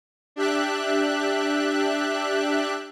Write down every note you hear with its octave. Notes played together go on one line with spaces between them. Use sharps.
D4 G4 E5 F#6